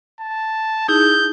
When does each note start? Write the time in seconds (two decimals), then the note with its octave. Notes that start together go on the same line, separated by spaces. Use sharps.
0.20 A5
0.88 D#4 E4 G#4 G6